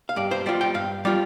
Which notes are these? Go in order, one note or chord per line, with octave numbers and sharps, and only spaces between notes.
F5
G2 D5
C5
G3 F4 D5
G5
G2 F5
G3 F4 D5